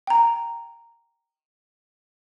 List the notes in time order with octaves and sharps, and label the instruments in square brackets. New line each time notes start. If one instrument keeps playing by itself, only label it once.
[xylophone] G5 A#5